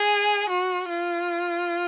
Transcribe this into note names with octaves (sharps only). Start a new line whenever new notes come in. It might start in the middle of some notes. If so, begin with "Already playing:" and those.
Already playing: G#4
F#4
F4